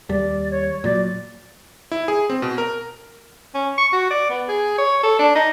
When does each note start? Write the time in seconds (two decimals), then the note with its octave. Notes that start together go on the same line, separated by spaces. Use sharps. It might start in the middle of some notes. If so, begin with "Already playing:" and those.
0.09 D#2 G3 D5
0.51 C#5
0.84 A#2 F#3 D5
1.92 E4
2.08 G#4
2.30 C4
2.42 B2
2.58 A#4
3.54 C#4
3.78 C#6
3.93 F#4
4.10 D5
4.30 B3
4.48 G#4
4.78 C#5
5.03 A4
5.19 D4
5.35 D#4